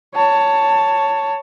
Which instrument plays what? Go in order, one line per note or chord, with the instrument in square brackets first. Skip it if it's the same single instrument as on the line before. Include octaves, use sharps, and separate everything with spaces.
[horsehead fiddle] C#5 A5